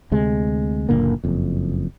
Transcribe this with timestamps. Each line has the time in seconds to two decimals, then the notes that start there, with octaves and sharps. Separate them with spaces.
0.11 D2 C3 G#3
0.89 F#1 A#2 D3 A#3
1.24 F#1 F2